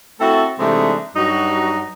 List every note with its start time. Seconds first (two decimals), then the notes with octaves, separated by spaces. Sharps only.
0.20 A3 C4 E4 F#4 A4
0.59 C3 E3 G#3 A3 D4 D#4
1.16 G2 F#3 D#4 F#4